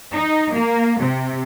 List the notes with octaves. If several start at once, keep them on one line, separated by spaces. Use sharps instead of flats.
D#4
A#3
C3